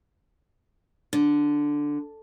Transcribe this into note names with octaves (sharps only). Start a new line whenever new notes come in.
D3